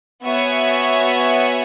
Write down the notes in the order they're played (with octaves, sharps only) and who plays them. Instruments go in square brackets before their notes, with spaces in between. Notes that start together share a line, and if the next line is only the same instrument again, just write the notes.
[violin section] B3 F#4 C#5 E5 G#5